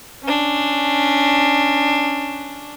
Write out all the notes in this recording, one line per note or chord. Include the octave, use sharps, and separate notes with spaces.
C#4 D4